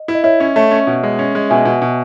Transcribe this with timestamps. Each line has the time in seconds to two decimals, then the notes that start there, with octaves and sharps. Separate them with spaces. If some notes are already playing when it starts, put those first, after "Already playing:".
Already playing: D#5
0.08 E4
0.15 D#5
0.23 E4 C#5 E5
0.40 C#4
0.56 A3 C#5 E5
0.71 C#4
0.87 B2
1.03 G#3
1.19 C#4
1.35 G#3
1.50 B2 E5 G#5
1.65 B2
1.82 B2